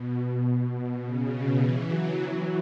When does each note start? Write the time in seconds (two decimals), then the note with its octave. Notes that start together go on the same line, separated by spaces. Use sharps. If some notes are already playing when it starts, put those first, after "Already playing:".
Already playing: B2
0.19 B2
0.75 B2
1.03 C#3
1.33 B2
1.61 E3
1.89 F#3